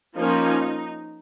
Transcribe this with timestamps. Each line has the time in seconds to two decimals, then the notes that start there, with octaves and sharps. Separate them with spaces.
0.15 F3 A#3 C#4 D#4